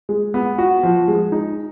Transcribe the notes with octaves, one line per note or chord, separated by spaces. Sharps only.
G#3
B3
F#4
F3
G#3
D#4